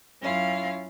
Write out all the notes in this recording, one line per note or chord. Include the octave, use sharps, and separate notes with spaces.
F#2 C#4 E4 F4 F5